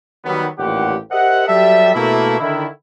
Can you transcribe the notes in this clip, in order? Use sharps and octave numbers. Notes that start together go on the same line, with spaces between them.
D#3 F#3 G3 B3
A1 D#2 A#2 G4 F#5
G4 A#4 C5 D#5 E5 F#5
F#3 G3 G4 A4 E5
B2 A3 A#3 E4
D3 D#3 E4